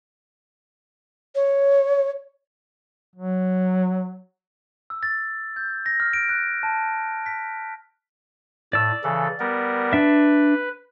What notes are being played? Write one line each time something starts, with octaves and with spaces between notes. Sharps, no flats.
C#5
F#3
E6
A6
G6
A#6
F6
D7
F#6
A5
B6
A2 D5 E6
C#3 E3 A4
G3 B3 A#4
D4 B4 E5